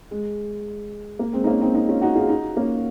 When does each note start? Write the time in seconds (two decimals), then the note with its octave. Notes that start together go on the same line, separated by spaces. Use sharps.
0.11 G#3
1.19 A#3
1.33 G#3 C4
1.44 D#4
1.47 A#3 C#4
1.61 C4 D#4
1.75 C4 D#4
1.89 C#4 F4
2.01 D#4 F#4
2.15 F4 G#4
2.29 D#4 F#4
2.57 A#3 C#4